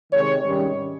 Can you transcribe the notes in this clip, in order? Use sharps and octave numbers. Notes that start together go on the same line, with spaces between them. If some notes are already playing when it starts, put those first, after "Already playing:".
C3 D#3 G#3 C#5
G#2 D#3 G3 C#4